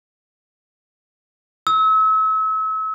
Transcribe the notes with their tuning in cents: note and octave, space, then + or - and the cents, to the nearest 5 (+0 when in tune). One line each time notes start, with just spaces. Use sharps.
E6 -35